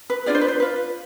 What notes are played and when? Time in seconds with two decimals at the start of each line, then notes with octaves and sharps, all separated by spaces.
0.10 B4
0.26 D4 F4 G#4 D5
0.35 C5
0.41 B4
0.48 C5
0.60 F4 B4